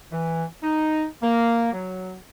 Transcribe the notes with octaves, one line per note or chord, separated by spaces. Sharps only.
E3
D#4
A#3
F#3